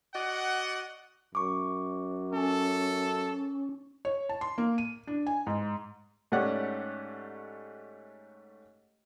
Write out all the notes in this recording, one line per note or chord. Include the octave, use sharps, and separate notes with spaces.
F#4 D5 D#5 F#5
F#2 C#6 D6
C#4 A4
C#5
A5
C6
A#3
D#7
D4
G#5
G#2
G#2 A3 C#4 G4 D5 F#5